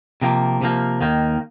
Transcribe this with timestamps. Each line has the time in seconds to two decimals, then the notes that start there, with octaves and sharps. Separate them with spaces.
0.21 C3 F3 A#3
0.62 C3 F3 A#3
1.01 D#2 D#3 A#3